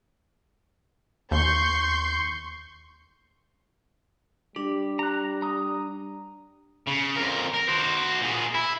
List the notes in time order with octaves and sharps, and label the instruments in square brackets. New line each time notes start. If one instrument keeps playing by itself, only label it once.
[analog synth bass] D#2 [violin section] C6 C#6 G6
[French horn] G3 [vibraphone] D4 [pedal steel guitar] G4
[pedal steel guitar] A#5 F#6
A#5 D#6
[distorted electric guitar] C#3
F2 A#4
A#4
F#4 C5
A#2 G#4
E4